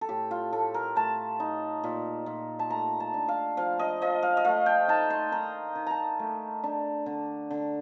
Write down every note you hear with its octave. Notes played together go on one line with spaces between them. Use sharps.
A4
A2 G4
F4
A2 A4
A#4
A3 A5
D#4
A#2
A#2
A5
A3 A#5
A5
D4
F5
F3 F5
D#5
F3 D#5
F5
D#5
A3 F5
G5
D#4 A5
C6
D#3 A#5
D#3
A5 A#5
A3
D4
D3
D3